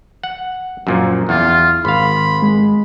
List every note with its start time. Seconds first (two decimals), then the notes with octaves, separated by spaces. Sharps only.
0.24 F#5
0.87 F#2 A#2 F3
1.29 E2 F4
1.85 G#1 F5 B5 C6
2.42 G#3